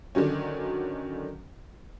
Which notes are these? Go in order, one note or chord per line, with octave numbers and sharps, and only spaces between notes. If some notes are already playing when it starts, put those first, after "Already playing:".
D3 D#3 F#3 C#4